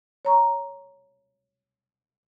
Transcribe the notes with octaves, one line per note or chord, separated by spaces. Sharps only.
C#5 A#5 C#6